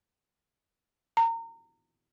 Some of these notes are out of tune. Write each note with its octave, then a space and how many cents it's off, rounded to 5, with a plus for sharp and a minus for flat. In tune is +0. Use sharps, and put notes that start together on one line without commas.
A#5 -30